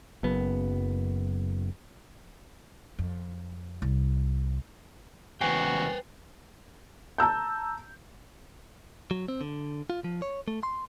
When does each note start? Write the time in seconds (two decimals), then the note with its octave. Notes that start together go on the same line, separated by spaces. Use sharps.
0.23 F#1 F#2 B3
2.99 F2
3.82 C2
5.41 E2 C#3 F#4 B4 C5 G5 G#5 C7
7.18 A5 A#5 E6 G6
9.11 F#3
9.28 C4
9.41 D3
9.90 F4
10.04 F3
10.22 C#5
10.48 A3
10.63 C6